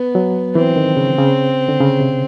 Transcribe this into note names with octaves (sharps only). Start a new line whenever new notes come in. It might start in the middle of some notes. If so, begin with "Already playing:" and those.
Already playing: B3
F#3
E3 C4
D#3
C#3
C#3
D3
C#3
C3